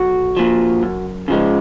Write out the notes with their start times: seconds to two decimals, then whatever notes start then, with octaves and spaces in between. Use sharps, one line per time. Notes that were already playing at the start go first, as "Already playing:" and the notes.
Already playing: B1 F#4
0.37 A#2 F3
0.83 F#2
1.28 C#3 F3 G#3